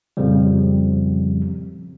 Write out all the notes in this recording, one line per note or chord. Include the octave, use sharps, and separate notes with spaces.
F2 A#2 C#3 F3 G3